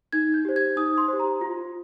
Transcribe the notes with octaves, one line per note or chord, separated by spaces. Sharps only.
D#4 G#6
G6
G4 C5
G#6
D#4 D#6
C6
G4 C5
A#5
F4